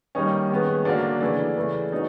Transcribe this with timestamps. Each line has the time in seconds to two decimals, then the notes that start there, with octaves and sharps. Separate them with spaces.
0.15 D#3 G3 A#3 C#4 D#4
0.50 D#3 G#3 B3
0.85 D3 F#3 A#3 D4
1.21 C#3 E3 A3 D4
1.57 C#3 E3 A3
1.92 F#3 B3 C#4 D#4